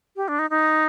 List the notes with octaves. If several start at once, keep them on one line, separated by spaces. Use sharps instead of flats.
G4
D4
D#4
D#4